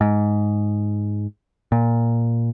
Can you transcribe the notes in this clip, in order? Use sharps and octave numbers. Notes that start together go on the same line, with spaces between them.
G#2
A#2